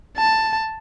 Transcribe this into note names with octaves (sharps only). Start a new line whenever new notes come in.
A5